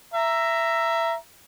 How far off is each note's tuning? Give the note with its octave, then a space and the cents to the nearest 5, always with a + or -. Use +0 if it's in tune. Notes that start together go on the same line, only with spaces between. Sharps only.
E5 +15 A#5 +0